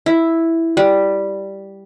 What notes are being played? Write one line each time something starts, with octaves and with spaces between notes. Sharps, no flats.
E4
G3